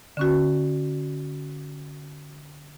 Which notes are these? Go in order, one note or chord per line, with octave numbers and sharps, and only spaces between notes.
D3 C#4 F#4